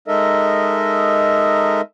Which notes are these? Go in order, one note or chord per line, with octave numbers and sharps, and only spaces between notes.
G#3 D#4 A4 A#4 D#5 E5